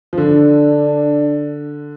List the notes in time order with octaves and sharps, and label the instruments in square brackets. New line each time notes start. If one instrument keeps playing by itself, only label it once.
[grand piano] F3
[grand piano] D3 [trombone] D4